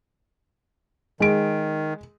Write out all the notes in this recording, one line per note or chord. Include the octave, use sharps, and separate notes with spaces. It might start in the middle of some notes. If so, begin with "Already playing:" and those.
D#3 G#3 D7